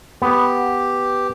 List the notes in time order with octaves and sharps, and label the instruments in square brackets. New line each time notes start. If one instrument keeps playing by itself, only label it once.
[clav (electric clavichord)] B3 [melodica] G4